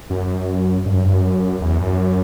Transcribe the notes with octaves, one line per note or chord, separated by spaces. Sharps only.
F#2
G2
F#2
G2
F#2
E2
F#2